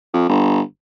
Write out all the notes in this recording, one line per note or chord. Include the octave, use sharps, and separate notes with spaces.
F2
G1